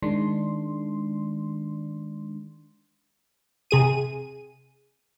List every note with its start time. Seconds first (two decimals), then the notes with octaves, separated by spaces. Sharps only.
0.02 D#3 G#3 D4 C6
3.71 C3 G#4 D#7